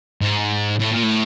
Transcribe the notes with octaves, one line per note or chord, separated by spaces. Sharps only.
G#2
A2
A#2
A2